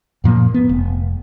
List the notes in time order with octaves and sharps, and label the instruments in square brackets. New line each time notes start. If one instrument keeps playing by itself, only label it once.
[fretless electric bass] F#2 A#2 F3 A#3
B3
F1